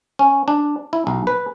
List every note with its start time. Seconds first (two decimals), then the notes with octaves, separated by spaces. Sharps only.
0.19 C#4
0.48 D4
0.93 E4
1.07 B1
1.27 B4